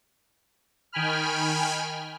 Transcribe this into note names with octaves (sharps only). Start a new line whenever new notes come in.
D#3 G5 G#5 B5 F6